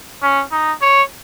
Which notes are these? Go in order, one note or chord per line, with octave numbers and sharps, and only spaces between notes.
C#4
D#4
C#5